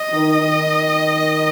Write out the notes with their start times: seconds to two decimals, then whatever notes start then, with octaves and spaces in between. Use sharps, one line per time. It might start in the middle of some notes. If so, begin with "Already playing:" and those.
Already playing: D#5
0.12 D#3
0.41 D#3